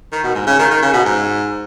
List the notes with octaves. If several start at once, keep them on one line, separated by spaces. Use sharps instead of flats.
D#3
B2
G#2
C#3
D#3
D#3
C#3
B2
G#2